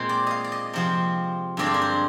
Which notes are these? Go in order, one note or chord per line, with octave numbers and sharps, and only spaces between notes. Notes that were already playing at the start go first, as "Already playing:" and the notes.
Already playing: A#2 G#3 C4 C5
D5
D#5 F5
D5
D#5
C3 F3 C4
G2 D3 G#3 C4 D5
C5
A#4
C5